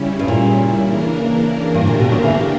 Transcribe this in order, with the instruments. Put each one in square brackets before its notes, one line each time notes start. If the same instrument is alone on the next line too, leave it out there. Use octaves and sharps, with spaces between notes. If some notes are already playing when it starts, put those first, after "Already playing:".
Already playing: [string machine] C#3 G3 C#4 E4
[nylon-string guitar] G2
A#2
[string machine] C#3 E3 A#3 D4 A#4
[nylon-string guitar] G2 [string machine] D3 A#3 D4 G4 A#4
[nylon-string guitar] A#2
B2
D3 F#3
C#3 E3